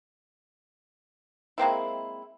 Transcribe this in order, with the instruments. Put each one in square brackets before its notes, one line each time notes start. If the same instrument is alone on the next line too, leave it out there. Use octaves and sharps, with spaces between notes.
[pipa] G#3 A#3 C4 E4